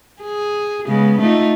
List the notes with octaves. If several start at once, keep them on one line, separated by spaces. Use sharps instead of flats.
G#4
C#3 G#3 B3
A3 D#4 F4